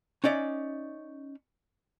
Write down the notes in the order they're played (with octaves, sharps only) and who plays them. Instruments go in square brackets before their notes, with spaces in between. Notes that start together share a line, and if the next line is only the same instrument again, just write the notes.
[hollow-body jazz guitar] C#4 D#4 D5 E5